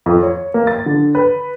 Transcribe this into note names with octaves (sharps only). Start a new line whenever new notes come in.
F2
C#5
A#3
A6
D3
B4